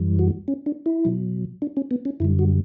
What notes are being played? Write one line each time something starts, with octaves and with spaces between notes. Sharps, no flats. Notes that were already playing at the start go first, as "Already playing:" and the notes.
Already playing: F#2 E3 G3
F#4
C#4
D4
E4
B2 F#3
D4
C#4
B3
C#4
F#2 D3 G3 E4
F#4